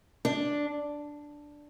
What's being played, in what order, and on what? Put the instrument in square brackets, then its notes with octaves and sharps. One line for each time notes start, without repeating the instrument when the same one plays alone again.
[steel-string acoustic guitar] D4